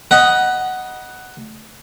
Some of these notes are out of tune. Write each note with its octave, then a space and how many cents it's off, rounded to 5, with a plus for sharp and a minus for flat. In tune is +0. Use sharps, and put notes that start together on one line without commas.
D#5 +0 F#5 +10 B5 -35